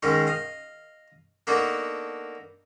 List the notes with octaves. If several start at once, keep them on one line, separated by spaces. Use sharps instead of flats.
G#2 D#3 G#3 C#4 D#4
D#5 F5
A#3 B3 D4 D#4 F#4 A4